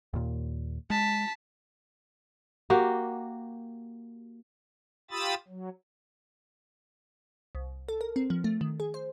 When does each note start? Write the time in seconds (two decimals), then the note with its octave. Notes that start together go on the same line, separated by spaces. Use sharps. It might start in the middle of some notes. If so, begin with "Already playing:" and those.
0.13 D#2 A#2
0.90 G#3 A5 B6
2.70 A#3 F#4 G4
5.11 F4 G4 B5 D#6 E6 A6
5.48 F#3
7.55 C2
7.89 A4
8.01 A#4
8.16 C4
8.30 F3
8.44 A3
8.61 D#3
8.80 G#4
8.94 C5